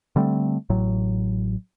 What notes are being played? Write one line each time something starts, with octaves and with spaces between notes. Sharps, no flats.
D3 G3 A3 C4
A1 A2 F#3